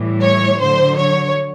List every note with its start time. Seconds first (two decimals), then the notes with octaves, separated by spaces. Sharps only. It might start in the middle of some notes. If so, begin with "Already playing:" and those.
Already playing: A2 E3 G3
0.24 C#5
0.60 D3 F#3 C5
0.98 C#5